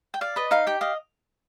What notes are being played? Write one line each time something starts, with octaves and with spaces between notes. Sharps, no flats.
G5
D5 F5
B4 D#5
D#4 F5
G4 G5
D#5 F5